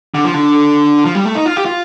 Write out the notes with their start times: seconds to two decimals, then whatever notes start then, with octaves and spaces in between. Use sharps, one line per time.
0.15 D3
0.25 F3
0.34 D3
1.05 F3
1.15 G3
1.25 A3
1.35 D#4
1.46 F4
1.57 G4
1.66 F4